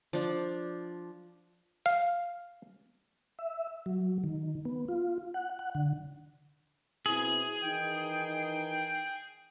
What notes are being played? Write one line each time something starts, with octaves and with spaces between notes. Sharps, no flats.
F3 D4
F5
E5
F#3
D#3
B3
F4
F#5
F#5
D3
B2 C4 E4 G#4
D#3 E3 D#4 G5